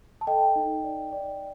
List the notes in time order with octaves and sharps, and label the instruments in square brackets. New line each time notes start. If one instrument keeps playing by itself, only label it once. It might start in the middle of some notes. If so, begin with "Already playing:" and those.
[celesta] A5
A4 D#5 G5
D#4
D5
D5